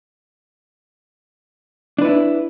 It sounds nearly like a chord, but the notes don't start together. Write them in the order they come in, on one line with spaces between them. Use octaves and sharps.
D4 B4 E4